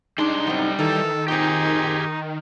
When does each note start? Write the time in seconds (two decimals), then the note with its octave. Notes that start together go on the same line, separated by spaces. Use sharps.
0.18 G3 G#3 D4 D#4 C6
0.47 F#2 A2 C4
0.79 D#3 E3 D#4 A4
1.28 A#2 C4 D#4 G4 G#4